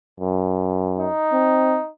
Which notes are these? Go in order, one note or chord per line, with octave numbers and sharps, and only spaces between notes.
F#2
D#4
C4